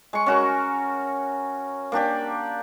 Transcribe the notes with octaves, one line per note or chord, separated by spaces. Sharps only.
G#3 C#6
C#4 F#4 A#4
A#3 D4 G4 D5